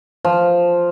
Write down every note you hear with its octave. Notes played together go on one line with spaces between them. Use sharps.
F3